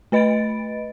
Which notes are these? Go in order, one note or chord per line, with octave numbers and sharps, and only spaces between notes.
A3 B4 D#5 B5 A6 D7